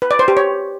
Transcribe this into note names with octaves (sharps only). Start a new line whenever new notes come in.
B4
D5
C5
G4
C#5